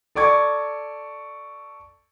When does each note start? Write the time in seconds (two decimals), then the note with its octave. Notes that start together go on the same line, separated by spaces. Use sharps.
0.15 A4 D5 C#6 G#6